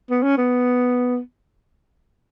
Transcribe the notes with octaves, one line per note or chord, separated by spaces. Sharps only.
B3
C#4
B3